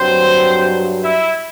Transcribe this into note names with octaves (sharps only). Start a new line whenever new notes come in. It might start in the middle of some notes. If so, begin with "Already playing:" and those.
Already playing: G2 F#3 C4 C5
E4 E5